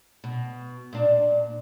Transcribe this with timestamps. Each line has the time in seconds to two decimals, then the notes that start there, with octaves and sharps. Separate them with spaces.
0.24 B2
0.93 A#2 D4